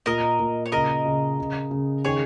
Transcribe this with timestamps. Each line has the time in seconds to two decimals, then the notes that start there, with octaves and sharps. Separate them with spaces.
0.06 A#2 A#4 D#5
0.40 A#2
0.66 C#5
0.72 C#3 A#4 D#5
1.06 C#3
1.39 C#3
1.71 C#3
2.04 D#3 G#4 C#5